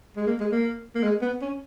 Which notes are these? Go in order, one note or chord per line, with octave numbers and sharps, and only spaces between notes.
G#3
A#3
G#3
A#3
A#3
G#3
B3
C#4